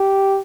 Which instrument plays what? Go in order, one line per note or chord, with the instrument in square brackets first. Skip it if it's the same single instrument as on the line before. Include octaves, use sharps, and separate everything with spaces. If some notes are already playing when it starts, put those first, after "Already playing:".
Already playing: [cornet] G4